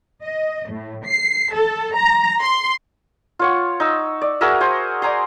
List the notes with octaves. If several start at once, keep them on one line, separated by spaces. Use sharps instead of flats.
D#5
A2
C7
A4
A#5
C6
F4 C#5 F#5
D#4 E6
D5
F#4 G#4 A#4 E5
C5 F#5 G#5
D5 G#5 A#5 C6